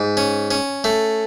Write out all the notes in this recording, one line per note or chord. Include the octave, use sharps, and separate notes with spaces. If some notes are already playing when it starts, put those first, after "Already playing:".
Already playing: G#2
C#4
C#4
A3